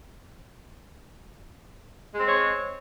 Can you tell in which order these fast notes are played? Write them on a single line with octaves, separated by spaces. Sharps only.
G#3 C4 C5 C#5